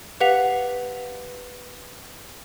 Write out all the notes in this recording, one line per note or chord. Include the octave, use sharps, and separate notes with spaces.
G4 B4 F5 F#5 B6 F7